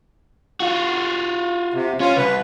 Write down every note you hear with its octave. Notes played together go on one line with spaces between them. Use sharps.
F4 F#4
C3
C#4 F4
C2 B4